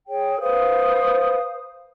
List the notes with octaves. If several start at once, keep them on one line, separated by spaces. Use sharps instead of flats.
G#4 C#5 G5
B4 C5 F5 D#6